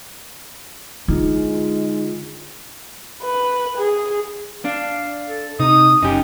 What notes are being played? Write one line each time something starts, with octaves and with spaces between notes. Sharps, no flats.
D3 G#3 D#4 F4
B4
G#4
D4 F5
A4
C3 D#4 D#6
F#1 C#4 D#4 G4